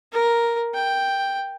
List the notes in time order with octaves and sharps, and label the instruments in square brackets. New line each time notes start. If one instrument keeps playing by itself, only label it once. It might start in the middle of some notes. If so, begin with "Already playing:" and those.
[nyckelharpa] A#4
G5